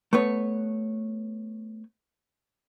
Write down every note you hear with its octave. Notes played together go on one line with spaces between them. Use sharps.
A3 B3 B4 C#5